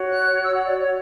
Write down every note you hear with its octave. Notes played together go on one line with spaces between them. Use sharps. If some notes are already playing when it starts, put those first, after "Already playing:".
Already playing: F#4 C#5
F#6
E6
F#5
D5
C#5